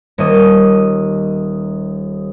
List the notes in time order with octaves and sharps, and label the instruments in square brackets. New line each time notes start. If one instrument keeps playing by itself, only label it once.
[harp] D#1 A#3 D#5